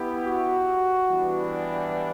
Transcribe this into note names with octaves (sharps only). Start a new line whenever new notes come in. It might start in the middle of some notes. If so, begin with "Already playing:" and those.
Already playing: B3 E4 G4
F#4
E3 G3 B3 D4